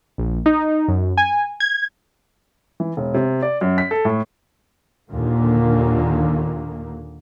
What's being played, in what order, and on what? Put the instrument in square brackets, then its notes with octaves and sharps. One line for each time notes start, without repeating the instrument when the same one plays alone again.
[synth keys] A#1
D#4
F#2
G#5
G#6
[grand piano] E3
E1
C3
D5
F#2
B6
A4
A2
[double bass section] D#2 A#2 D3 D#3 A#3